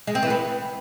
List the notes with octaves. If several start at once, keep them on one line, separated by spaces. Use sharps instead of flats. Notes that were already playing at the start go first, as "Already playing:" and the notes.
G#3
C4
E3
B3